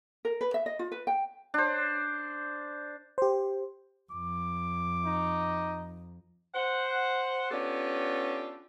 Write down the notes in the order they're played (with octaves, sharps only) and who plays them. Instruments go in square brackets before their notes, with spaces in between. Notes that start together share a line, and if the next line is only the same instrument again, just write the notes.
[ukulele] A#4
B4
E5
D#5
F4
B4
G5
[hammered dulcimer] D4 C5
[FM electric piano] G4 C5
[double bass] F2 [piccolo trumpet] D6
[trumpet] D#4
[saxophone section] C5 F#5
B3 C#4 D4 F4 G4 A4